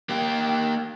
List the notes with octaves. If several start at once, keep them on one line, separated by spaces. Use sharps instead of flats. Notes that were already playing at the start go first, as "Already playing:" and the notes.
A#3 G4